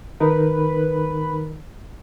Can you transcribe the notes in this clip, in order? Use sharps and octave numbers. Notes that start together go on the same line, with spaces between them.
D#3 D#4 A#4 B4